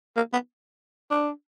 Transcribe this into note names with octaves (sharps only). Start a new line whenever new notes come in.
A#3
B3
D4